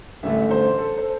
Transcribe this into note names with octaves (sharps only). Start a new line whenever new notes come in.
A1 G2 D3 A3 E5
C5
A4
C5